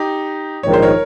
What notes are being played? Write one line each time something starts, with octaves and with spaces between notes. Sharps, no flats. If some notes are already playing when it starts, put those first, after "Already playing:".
Already playing: D#4 G4
A#1 G#2 D#3 C#5
C5
A#4 C#5